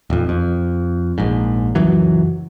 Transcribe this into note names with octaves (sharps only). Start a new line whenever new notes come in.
D#1 F2
F2
A#1 G#2
C#2 F#2 E3 F#3